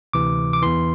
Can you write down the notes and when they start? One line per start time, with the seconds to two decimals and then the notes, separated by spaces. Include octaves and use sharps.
0.13 D2 C3 E3 D6
0.53 D6
0.62 E2 E3 C6